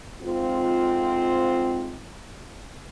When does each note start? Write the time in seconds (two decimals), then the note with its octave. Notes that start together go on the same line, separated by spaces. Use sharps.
0.21 F2 G#2 C4 F4